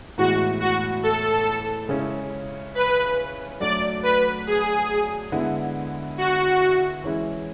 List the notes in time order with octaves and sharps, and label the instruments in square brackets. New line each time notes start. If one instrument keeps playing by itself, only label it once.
[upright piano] A2 E3 G#3 B3 [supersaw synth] F#4
[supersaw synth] F#4
A4
[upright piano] C#3 G#3 C#4 E4
[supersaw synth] B4
[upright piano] F#3 A3 D4 F#4 [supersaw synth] D5
[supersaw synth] B4
G#4
[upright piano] D3 G#3 B3 E4
[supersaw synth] F#4
[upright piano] E3 G#3 C#4 E4